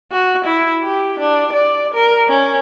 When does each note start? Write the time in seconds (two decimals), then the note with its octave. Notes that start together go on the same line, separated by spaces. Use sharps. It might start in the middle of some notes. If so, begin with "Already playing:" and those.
0.12 F#4
0.45 E4
0.83 G4
1.20 D4
1.53 D5
1.95 A#4
2.29 C#4